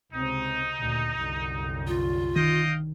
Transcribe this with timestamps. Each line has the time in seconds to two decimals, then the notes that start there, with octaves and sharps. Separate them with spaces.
0.12 C#2 C3 C4 D#4
0.77 D2 A#2
1.16 C2 F#2 D3
1.87 F4
2.36 D#3 D#5 F5 G5